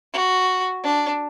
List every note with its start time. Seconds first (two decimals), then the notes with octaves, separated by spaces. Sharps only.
0.13 F#4
0.83 D4